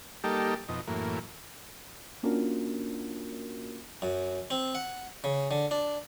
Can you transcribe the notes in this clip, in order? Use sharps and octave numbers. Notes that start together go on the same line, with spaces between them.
G3 A#3 D#4 G4 A4
F2 B2 D#4
F#2 A2 E3 A#3
A#3 C#4 D4 F4 F#4 A#4
F#2
C4
F#5
C#3
D3
D4